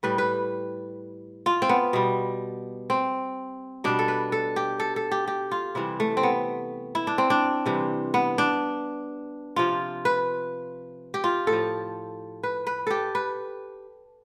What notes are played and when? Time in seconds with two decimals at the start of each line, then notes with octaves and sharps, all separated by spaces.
0.03 A2 G3 B4
0.18 B4
1.46 F4
1.62 C4
1.69 B3
1.93 B2 G3
2.90 C4
3.84 B2 G3 D4
3.99 A4
4.08 B4
4.32 A4
4.56 G4
4.80 A4
4.96 A4
5.11 G4
5.27 G4
5.51 F4
5.75 C3 E3 G3 E4
6.00 A3
6.17 C4
6.23 B3
6.95 E4
7.07 D4
7.18 C4
7.30 D4
7.66 C3 E3 G3
8.14 B3
8.38 D4
9.56 C3 F3 F4
10.05 B4
11.14 G4
11.24 F4
11.47 A2 A4
11.53 F3
12.43 B4
12.67 B4
12.87 G4 A4
13.15 B4